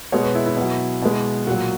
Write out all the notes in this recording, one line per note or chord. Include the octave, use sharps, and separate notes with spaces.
B2 G#3 C#5
B4
E4
E4
B2 F#3
B2 G#3
A#2 F#3 F#4